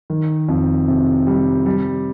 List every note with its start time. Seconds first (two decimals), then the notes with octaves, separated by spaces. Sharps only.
0.10 D#3
0.48 F2
0.88 C3
1.27 G3
1.66 G3